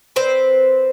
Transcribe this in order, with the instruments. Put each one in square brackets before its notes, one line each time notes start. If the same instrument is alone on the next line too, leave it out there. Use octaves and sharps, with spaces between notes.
[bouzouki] C4 B4 C5